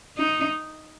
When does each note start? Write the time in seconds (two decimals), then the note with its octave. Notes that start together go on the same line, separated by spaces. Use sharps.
0.18 D#4